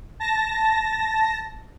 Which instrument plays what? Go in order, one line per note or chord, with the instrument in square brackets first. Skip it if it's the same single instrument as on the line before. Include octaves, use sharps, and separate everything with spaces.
[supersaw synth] A5 A#6